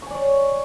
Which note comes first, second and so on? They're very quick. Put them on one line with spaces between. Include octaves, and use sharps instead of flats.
C#6 G#5 D5 C#5